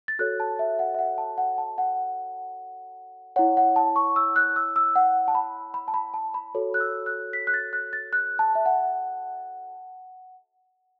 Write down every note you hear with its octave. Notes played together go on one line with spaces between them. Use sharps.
A6
F#4 A4 C#5 F#6
A5
E5
F#5
E5
F#5
A5
F#5
A5
F#5
E4 C#5 F#5
F#5
A5
C#6
E6
F#6
E6
E6
F#5
A5
B5
B5
A5
B5
A5
B5
F#4 A4 C#5
F#6
E6
F#6
B6
F#6
A6
F#6
A6
F#6
A5
E5
F#5